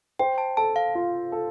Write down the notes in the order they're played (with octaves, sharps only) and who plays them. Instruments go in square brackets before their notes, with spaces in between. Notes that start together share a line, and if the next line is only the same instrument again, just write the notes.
[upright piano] C5 [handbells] G5
[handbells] A5
[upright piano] A4 [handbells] A5
[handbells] F5
[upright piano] F4
A4